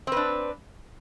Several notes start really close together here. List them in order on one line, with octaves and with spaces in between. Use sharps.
C4 B4 D4